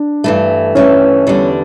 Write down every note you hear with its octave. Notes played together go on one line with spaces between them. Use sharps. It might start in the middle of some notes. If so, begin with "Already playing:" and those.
Already playing: D4
G2 E3 A3
G2 E3 A3 C#4
E2 D3 G3 D4